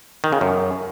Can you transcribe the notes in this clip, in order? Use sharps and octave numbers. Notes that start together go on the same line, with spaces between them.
D#3
C#3
F#2